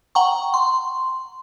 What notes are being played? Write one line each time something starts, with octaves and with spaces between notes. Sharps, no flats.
F#5 G5 A#5 C#6
C6